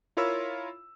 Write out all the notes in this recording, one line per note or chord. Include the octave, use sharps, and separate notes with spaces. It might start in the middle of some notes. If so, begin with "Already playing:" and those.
E4 F4 A#4 C#5 B5 E6